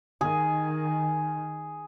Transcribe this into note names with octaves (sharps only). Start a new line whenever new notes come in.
D#3 G#4